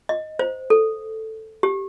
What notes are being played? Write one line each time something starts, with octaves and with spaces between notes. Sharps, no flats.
D#5
C5
A4
G4